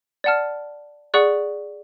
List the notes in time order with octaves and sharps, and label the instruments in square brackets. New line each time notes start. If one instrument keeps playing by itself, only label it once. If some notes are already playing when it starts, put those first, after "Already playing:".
[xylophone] D5 F#5 A5 F6
G#4 D5 F#5 C#6 F#6